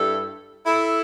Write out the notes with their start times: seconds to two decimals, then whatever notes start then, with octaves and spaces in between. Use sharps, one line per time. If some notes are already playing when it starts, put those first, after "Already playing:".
Already playing: G2 G3 E4 A4
0.66 E4 A4